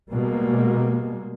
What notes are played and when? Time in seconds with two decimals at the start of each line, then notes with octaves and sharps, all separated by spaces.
0.11 B2 G3 G#3 A#3